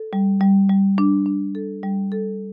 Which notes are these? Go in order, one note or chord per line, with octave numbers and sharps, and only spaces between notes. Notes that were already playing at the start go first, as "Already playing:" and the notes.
Already playing: A4
G3
G3
G3
D4
D4
A4
G3
A4